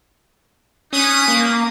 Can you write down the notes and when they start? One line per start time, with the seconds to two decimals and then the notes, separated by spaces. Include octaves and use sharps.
0.93 C#4 D#4 B4 D#6
1.28 A#3